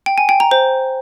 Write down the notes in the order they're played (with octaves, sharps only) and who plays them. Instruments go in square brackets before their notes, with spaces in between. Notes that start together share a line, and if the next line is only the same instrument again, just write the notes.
[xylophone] G5
G#5
G5
A#5
C5